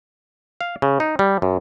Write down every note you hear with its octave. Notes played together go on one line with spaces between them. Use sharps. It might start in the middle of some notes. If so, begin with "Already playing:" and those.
F5
C#3
D#4
G3
F#2